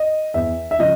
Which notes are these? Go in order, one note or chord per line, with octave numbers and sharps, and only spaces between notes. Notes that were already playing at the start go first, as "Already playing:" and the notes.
Already playing: D#5
E2 E5
E5
C#3 F3 D#5